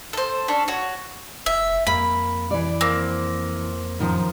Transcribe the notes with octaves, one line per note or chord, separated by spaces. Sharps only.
A4 C5
C#4 D4 A4
F#4 C#5
F1 E5
F2 A#3 B5
E3 D5
A#3 C4
F#2 D#3 F3